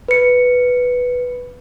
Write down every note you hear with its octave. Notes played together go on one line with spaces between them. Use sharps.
B4 C#7